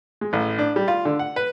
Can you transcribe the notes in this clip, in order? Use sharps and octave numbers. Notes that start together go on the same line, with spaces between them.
G#3
A1
D4
G3
F4
D3
F#5
B4